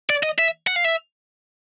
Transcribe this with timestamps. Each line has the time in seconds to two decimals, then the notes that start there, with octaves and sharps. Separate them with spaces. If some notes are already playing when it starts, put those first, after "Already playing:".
0.10 D5
0.23 D#5
0.38 E5
0.67 F#5
0.76 F5
0.85 E5